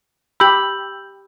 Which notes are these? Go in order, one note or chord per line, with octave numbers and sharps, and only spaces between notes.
G4 B5 E6 G6 F#7